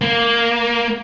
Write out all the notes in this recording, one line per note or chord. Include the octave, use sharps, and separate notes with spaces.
A#3